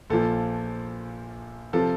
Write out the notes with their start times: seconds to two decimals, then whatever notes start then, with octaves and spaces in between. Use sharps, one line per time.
0.10 A#1 A#2 F3 A4
1.73 C3 F3 A4